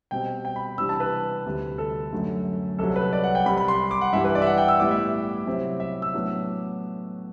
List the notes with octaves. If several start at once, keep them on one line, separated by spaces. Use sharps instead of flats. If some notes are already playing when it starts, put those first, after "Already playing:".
B2 G3 C4 G5
G5
B5
C3 E3 G3 D4 E6
A5
B4
D2 C3 G3
A4
F#2 D3 A3
C2 C3 F#3 A4
B4
D5
F#5
G5
C2 C3 G3 B5
B5
C6
D6
F#5
G2 E3 G3 D4 E5
B4
D5
E5
F#5
G5
E6
A2 G3 B3 E4 D6
E5
C3 F#3 C4 E4
E5
E6
A2 F#3 B3 D4